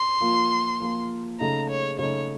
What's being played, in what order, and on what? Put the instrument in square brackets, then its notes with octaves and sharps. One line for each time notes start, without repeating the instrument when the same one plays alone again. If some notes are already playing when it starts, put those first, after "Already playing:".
Already playing: [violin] C6
[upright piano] F3 A#3 F4
F3 A#3 F4
[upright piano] C#3 A3 D#4 [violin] A#5
[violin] C#5
[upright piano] C#3 A3 D#4 [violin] C#5